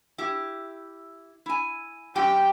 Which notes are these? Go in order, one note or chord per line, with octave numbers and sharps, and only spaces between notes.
E4 G4
E4 G#5
F#2 G4 G5